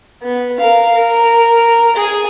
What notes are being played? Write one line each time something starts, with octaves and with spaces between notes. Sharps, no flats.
B3
A#4 F5
A#4
G#4 G#5